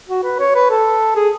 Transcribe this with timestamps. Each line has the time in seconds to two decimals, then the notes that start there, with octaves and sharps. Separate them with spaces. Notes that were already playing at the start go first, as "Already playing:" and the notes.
0.09 F#4
0.23 B4
0.39 C#5
0.55 B4
0.70 A4
1.15 G#4